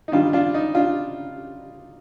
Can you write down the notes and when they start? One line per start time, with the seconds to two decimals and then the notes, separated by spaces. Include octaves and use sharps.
0.08 D#4
0.12 G2 D#3 G3 D4 F4
0.33 D4 F4
0.54 D#4
0.75 D4 F4